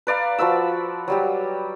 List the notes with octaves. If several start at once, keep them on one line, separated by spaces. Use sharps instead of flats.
B4 D5 F5 A#5
F3 F#4 B4 E6
F#3 G3 G4